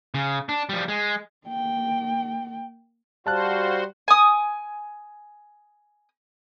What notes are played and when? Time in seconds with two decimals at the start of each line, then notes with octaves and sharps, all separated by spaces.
0.14 C#3
0.49 D4
0.69 F3 G3
0.88 G#3
1.47 A#3 G5
3.27 G3 F#4 C5 F5 A5 F#6
4.08 G#5 D#6